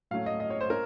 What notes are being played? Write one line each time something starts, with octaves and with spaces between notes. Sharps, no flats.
A2 F#3 A3 C#4 F5
D#5
D#5
C#5
C5
C#4 A#4